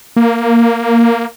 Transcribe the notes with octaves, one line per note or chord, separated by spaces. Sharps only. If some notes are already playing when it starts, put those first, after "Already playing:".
A#3